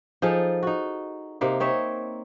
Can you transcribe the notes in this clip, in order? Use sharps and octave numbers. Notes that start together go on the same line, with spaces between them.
F3 D#4 G#4 A4
D#4 F#4
C3 A#3 D#4
C4 D#4 C#5 E5